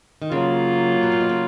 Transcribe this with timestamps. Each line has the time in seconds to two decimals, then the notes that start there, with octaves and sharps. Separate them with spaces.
0.22 D#3
0.31 C#3 F#3 A#3 F4
1.03 B2
1.12 A#2
1.21 B2
1.29 C#3